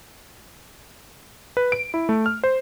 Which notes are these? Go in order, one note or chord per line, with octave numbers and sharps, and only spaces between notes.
B4
D7
E4
A3
F6
C5